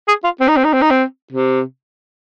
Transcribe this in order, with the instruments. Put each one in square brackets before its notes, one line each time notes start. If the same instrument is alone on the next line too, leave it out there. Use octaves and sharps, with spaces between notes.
[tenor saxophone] G#4
F4
C4
D#4
C4
D#4
C4
D#4
C4
C3